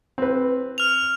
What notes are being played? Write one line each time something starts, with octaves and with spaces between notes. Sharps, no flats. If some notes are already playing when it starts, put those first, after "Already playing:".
C4 B4
F6 F7